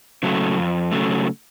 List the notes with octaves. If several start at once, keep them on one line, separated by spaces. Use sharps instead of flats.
C#3 F#3 A3
F2
C#3 F#3 A3